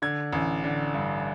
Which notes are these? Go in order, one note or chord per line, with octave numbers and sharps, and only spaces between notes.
D3 G#6
A1
D3
G2